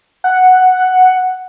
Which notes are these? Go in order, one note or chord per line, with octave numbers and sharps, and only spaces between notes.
F#5